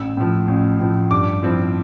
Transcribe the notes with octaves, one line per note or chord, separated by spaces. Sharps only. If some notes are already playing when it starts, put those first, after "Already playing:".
Already playing: A1 E6
A2 F3
A1
A2 F3
G2 D6
F3 C4 E4